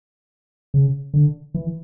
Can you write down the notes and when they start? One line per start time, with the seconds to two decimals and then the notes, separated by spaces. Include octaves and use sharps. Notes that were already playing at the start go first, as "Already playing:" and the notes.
0.74 C#3
1.14 D3
1.54 E3